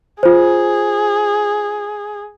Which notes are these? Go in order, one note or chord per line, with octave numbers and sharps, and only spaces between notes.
F4 G#4 C5